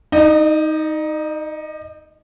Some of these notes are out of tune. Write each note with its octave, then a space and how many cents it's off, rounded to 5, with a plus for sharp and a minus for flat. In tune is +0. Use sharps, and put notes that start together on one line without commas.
D#4 +15 D#5 -40